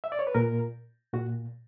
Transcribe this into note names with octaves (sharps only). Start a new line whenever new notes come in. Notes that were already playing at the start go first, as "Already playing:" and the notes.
E5
D5
C#5
B4
A#2 A#4
A#2 F#4